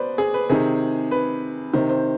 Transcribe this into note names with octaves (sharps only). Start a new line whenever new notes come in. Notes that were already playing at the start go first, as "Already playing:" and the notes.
Already playing: B2 B4 C5 D5
G#4
B4
C3 D#3 G#4
B4
C3 D#3 C5
C5